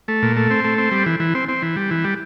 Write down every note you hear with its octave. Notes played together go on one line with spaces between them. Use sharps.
A3
A#2
A3
C4
A3
C4
G3
E3
E3
C4
C4
E3
G3
E3
G3